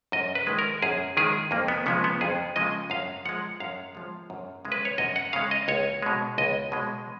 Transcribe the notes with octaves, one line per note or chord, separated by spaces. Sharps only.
F#2 D#5
B4
D#3 G#3
A#4
F#2 G#4
D#3 G#3 G#4
F2 A#3
B3
C#3 F3 G#3 B3
B3
F2 G#4
C#3 F3 G#3 D#5
F#2 F5
F3 G#3 F#5
F#2 F5
F3 G#3
F#2
C#3 G#3
B4
C#5
F#2 D#5
F#5
C#3 G#3 F5
D#5
C#2 C#5
B2 G#3
C#2 D#5
B2 G#3